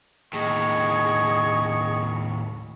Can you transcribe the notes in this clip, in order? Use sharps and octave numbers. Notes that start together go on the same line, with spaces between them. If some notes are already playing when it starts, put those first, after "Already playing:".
D#2 A2 G#4 D#5 C#6